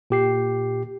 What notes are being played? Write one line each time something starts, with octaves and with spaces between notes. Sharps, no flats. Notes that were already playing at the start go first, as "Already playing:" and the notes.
A#2 G4 C7